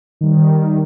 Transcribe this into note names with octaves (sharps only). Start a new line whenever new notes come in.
D#3 G3